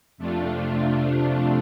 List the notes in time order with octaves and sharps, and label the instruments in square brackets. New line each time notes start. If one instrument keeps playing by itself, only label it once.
[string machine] F2 C3 A3 D4 F4